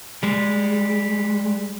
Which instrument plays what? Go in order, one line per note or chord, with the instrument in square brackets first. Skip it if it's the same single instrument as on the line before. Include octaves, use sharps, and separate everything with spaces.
[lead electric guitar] G3 G#3